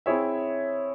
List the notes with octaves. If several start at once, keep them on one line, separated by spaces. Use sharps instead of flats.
C4 E4 G#4 C#5 E5